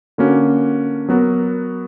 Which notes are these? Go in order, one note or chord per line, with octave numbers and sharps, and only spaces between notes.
D3 A#3 C#4 F#4
F#3 B3 F#4 A#4